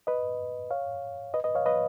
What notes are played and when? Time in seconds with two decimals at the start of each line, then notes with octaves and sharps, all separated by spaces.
0.07 B4 D#5
0.71 C#5 F5
1.34 B4 D#5
1.44 B4 D#5
1.55 C#5 F5
1.66 B4 D#5